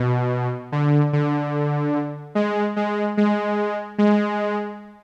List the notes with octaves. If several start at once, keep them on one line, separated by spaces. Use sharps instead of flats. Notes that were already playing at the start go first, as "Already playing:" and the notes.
Already playing: B2
D3
D3
G#3
G#3
G#3
G#3